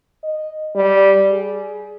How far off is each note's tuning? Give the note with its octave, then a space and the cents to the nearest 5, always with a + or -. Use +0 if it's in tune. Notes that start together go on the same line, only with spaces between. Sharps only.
D#5 -10
G3 -5
G#4 +15